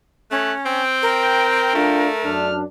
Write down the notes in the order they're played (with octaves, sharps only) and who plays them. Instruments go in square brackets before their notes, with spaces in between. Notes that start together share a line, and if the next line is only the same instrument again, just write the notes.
[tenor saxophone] A3 [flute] C#4 [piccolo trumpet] F#6
[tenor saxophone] C4 [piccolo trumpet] G5
[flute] A#4
[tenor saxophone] A3 [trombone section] D4 F4
[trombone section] F#2 D4 [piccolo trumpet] F6